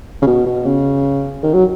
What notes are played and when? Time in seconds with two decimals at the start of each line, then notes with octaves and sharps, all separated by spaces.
0.22 C#3
0.26 B2
0.46 B2
0.65 C#3
1.43 D#3
1.53 F#3